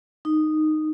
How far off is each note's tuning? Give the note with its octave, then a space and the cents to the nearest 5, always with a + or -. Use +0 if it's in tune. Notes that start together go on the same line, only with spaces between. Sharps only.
D#4 -10